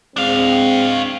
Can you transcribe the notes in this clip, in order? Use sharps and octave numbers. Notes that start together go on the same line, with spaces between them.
G#3 C4 D4 F5